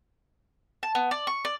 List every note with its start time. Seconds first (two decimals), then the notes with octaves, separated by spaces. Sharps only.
0.83 A5
0.95 B3
1.11 D5
1.27 C#6
1.45 D5